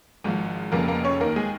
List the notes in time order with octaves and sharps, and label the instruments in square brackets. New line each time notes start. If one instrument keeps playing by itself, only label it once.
[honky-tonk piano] G#1 G#2 F3
F1 F2 C#3 F3 A#3 A#4
A#3 A#4
C#4 C#5
D#2 D#3 A#3 A#4
G#3 G#4